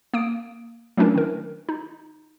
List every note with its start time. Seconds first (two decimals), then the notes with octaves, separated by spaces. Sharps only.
0.14 A#3 D#6 D7
0.97 F#3 A3 C#4 D4 E4 A#4
1.15 D#3 A#4
1.69 D#4